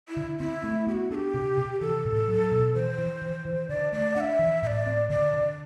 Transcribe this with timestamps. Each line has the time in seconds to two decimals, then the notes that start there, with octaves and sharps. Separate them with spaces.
0.09 E4
0.17 D3
0.40 C4 E4
0.64 A3
0.87 B3 G4
0.92 F#4
1.10 D4 G4 A4
1.34 C3
1.57 C3
1.81 E3 A4
2.05 A2
2.28 F#3
2.52 B2
2.74 E3 C5
2.98 E3
3.22 E3
3.45 E3
3.69 D3 D5
3.92 A3 D5
4.16 D4 F#5
4.20 E5
4.39 E3
4.63 A2 E5
4.67 D5
4.86 C4
5.10 D3 D5
5.33 D3